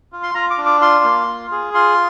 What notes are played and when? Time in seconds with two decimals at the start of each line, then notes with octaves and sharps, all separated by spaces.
0.12 F4
0.23 C6
0.35 F4 A#5
0.50 D6
0.58 D4
0.66 D6
0.81 F4 C6
1.04 A#3
1.27 F4
1.51 G#4
1.74 F4 C6